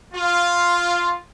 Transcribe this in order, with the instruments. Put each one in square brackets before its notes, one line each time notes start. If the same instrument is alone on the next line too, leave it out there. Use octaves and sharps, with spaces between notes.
[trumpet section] F4